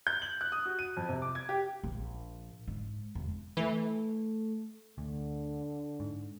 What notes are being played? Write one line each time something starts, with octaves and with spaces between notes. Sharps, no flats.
G6
F#7
F#6
D#6
F#4
D#7
F2
C3
D6
G#6
G4
A#1
G#2
E1
E3 A3
D2 D3
G#2